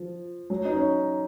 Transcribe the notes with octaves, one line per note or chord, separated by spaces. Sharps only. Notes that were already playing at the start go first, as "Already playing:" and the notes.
Already playing: F3
F#3
D#4
C#4